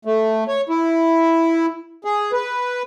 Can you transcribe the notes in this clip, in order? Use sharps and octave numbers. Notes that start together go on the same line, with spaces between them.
A3
C#5
E4
G#4
B4